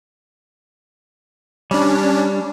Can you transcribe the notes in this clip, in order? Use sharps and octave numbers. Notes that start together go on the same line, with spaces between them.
G3 C#4 D4